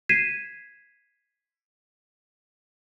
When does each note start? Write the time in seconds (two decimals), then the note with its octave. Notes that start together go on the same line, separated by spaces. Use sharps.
0.09 G#6 B6 C7 D#7 E7